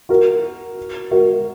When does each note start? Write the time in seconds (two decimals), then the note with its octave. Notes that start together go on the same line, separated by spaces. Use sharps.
0.09 F#4 A#4
1.11 F#4 A#4